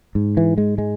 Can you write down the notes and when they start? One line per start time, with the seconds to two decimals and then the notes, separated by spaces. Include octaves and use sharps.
0.15 G#2
0.37 E3
0.58 G#3
0.78 G#3